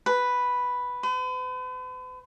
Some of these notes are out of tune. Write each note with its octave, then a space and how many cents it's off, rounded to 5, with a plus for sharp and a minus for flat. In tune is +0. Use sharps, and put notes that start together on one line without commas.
B4 +0
B4 +45